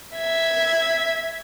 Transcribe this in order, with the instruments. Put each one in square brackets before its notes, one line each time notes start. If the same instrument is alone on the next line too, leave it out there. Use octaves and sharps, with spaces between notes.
[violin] E5 G#6